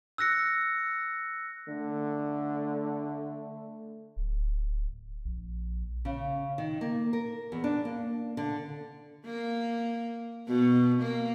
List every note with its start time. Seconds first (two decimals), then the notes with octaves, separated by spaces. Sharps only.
0.18 E6 F#6 A#6 C#7
1.68 D3 A3
4.16 D1
5.25 A#1
6.05 C#3
6.58 D#3
6.81 A#3
7.13 A#4
7.52 E2
7.64 D4
7.85 A#3
8.37 D3
9.26 A#3
10.47 B2
11.02 A#3